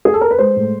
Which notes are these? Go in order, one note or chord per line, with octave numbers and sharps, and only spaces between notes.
G#4
A4
A#4
B4
G#3 C5
A2